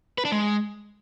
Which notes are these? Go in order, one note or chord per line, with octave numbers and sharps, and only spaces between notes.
B4
D4
G#3